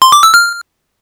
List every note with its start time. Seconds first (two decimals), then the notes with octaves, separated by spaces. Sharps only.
0.02 C6
0.12 D6
0.23 E6
0.34 F6